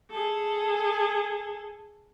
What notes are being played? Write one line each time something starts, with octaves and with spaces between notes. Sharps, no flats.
G#4 A4